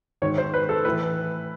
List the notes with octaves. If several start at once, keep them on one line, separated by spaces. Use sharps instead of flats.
G#2 D#3 C#5
C5
B4
A4
A2 E3 B4